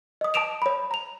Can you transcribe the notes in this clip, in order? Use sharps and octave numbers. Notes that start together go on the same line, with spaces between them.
D#5 D#6
A5 D6 D#6 D7 E7 F7
C#5 B5
A#5 F7